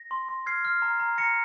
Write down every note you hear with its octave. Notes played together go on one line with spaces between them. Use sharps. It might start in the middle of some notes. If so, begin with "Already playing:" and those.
Already playing: A#6
C6
C6
F6 G#6 C7
F6
A#5
A#5
A#5 A#6 C#7